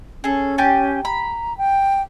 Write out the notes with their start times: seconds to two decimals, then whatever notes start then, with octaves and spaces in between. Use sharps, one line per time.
0.24 C#4 G#4 A4
0.58 G4 G#5 A5
1.05 A#5 B5
1.58 G5